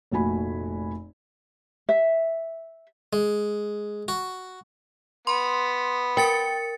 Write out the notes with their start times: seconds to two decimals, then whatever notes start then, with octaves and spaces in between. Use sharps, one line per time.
0.12 F1 A#2 A3 F#4 G#5 B5
1.89 E5
3.13 G#3
4.08 F#4
5.27 B3 C6
6.17 A#4 G5 A6 C#7